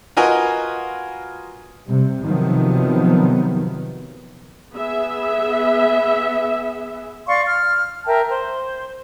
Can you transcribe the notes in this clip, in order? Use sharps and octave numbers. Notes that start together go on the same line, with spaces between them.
F4 F#4 A#4 B4 D#5 G#5
C3 G3
C3 D#3 F3 F#3 B3
B3 G#4 E5
D5 F5 C6 C#6
F6
A#4 E5 G5 A5
C5